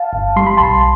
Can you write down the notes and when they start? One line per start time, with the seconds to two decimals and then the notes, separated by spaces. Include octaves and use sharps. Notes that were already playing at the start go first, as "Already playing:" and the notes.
Already playing: F5 A5
0.13 G1
0.36 G3 C6
0.46 B5
0.57 B1 A5 C6